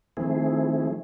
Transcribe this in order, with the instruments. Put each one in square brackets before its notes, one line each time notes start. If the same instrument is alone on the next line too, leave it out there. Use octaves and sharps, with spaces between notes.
[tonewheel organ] D#3 F3 A3 C4 E4 G#4